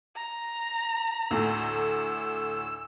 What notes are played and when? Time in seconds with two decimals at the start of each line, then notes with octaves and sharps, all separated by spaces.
0.16 A#5
1.31 D2 A2 E6